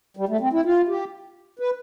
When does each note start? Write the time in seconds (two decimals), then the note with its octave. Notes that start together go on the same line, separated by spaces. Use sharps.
0.17 G3
0.29 A3
0.40 C4
0.53 E4
0.65 F4
0.88 G4
1.59 B4